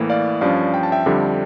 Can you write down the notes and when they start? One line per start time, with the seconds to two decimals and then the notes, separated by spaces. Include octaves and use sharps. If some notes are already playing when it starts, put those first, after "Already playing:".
Already playing: A2 E3 A#3
0.10 D5 F5
0.41 G2 F3 C#4 D5 F5
0.74 G5
0.83 A5
0.92 E5 G5
1.06 F2 D3 G3 D4